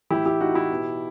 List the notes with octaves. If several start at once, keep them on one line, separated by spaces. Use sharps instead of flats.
A2 E3 E4 G4
E4 G4
D#4 F#4
E4 G4
B2